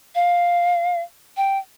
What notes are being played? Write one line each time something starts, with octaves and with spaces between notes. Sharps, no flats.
F5
G5